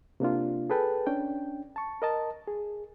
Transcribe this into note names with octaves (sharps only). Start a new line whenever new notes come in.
C3 A#3 D4 F4
G#4 A4 B4 G5 A5
C#4 D4 G5
A5 C#6
A#4 D#5 A5
G#4